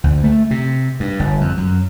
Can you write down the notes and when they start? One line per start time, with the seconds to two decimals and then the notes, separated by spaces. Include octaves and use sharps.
0.04 D2
0.23 A3
0.51 C3
1.00 G2
1.20 G1
1.41 F2
1.57 F#2